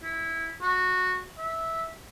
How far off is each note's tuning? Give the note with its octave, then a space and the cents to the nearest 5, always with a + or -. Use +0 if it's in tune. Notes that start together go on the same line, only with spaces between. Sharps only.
E4 -10
F#4 -10
E5 -10